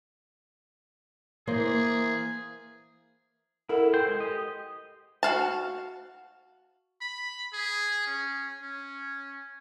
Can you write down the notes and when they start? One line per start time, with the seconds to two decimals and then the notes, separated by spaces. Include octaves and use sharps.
1.47 E3 A#3 G#4 C5
3.69 E4 A4 A#4 F#5
3.94 C5 G5
4.06 G#3
4.20 G4 D#5
5.23 F#4 F5 A5
7.01 B5
7.53 G#4
8.07 C#4
8.62 C#4